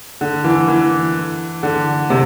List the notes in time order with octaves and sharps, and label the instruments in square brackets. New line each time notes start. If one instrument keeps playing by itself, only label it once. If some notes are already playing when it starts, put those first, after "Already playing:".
[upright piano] D3
E3
E3
D3
C3